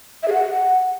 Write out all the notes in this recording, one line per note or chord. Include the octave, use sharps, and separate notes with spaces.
E5
G#4
F#5